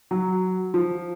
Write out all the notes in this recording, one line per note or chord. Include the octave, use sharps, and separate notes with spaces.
F#3
F3